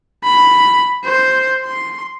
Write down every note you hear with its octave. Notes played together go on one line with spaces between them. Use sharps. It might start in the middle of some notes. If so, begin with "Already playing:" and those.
B5
C5
C6